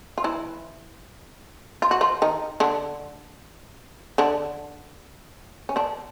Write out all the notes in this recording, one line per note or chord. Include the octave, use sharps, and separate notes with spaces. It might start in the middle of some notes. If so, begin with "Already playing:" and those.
F4
E3 E4
F4
F#4
F3 F4
D#3 D#4
D3 D4
D3 D4
C#4
D3 D4